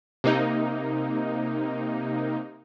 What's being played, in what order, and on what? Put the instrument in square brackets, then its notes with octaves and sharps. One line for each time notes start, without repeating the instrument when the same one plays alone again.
[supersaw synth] C3 A#3 D#4